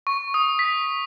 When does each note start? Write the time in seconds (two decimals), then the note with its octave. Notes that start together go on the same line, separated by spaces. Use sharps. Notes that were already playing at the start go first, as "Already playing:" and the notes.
0.07 C#6
0.34 D#6
0.59 B6